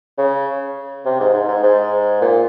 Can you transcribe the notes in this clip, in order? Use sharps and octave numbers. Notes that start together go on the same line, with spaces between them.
C#3
C3
G#2
G#2
G#2
G#2
A#2